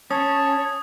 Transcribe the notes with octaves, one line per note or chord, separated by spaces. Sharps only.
C#4 C#5 A5 D#6